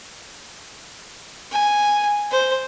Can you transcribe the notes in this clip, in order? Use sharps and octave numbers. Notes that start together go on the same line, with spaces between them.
G#5
C5